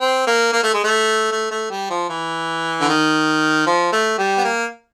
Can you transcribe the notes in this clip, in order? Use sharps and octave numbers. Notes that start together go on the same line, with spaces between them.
C4
A#3
A#3
A3
G#3
A3
A3
A3
G3
F3
E3
D3
D#3
F3
A3
G3
B3
A#3